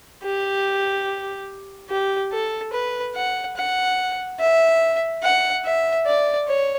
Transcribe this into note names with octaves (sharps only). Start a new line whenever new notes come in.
G4
G4
A4
B4
F#5
F#5
E5
F#5
E5
D5
C#5